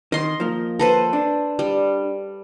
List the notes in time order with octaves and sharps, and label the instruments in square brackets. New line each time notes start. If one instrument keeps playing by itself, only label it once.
[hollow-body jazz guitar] D#3 [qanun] D#5 C6
[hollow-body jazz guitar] F3 A#3
[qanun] A4 B4 C5
[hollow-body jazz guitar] D4
[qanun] G3